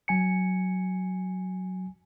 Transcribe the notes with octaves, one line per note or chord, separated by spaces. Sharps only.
F#3 G#5 C#7